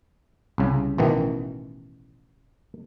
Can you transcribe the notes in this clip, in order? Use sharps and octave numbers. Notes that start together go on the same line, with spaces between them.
C2 C#3
A1 B2 D#3 E3